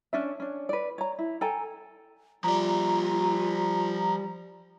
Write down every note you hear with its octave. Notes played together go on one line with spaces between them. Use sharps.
C#4 D4 E5
C#4 D4
B4 D5
C#5 A#5
E4
A4 G5 G#5 A#5
F3 G3 F4 D5 A#5